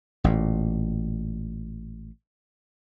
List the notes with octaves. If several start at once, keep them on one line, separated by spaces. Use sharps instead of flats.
A1 A#2